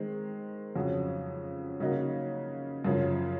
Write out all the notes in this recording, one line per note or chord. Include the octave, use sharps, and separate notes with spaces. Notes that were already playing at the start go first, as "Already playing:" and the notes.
Already playing: D#3 G#3 C4
F2 C#3 F#3
C#3 F#3 A#3 D#4 F#4
F#2 C#3 F3